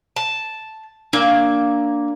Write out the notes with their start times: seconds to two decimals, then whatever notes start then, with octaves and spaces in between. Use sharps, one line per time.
0.16 A5
1.13 A#3 D4